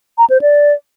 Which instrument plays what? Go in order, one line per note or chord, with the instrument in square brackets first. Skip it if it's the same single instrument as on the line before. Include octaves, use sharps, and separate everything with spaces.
[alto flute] A#5
C5
D5